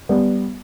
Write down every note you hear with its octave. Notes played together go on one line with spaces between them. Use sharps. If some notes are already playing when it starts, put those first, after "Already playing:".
G3 B3